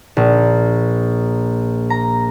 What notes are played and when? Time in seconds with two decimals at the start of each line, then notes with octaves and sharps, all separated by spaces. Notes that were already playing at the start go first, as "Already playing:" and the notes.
0.17 A#1
1.90 A#5